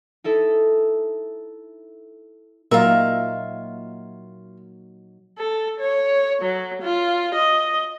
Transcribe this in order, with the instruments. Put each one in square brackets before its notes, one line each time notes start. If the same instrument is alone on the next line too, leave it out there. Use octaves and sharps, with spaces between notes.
[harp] D#4 E4 A4
[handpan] A#2 A#3 A#4 [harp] F#3 D#4 [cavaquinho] F4 E5
[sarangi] A4
C#5
F#3
F4
D#5